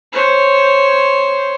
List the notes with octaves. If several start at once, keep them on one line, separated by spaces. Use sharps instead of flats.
C5 C#5